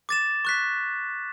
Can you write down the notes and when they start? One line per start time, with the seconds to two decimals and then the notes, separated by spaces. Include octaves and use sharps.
0.09 D6 A6 E7
0.45 C#6 F#6 B6